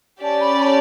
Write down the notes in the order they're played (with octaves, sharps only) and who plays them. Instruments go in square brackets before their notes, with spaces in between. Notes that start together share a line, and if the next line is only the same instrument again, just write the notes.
[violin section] C#4 G4 D5 [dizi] A5
[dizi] B5
B5
A5